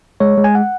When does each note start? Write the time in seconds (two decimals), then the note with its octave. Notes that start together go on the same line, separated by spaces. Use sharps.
0.20 G#3 C#5
0.37 G#3
0.44 G#5
0.55 F#5